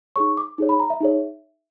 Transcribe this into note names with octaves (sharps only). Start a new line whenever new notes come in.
D#4 G#4 C#5 C#6
D6
D#4 G#4 C#5
B5
A#5
E5
D#4 G#4 C#5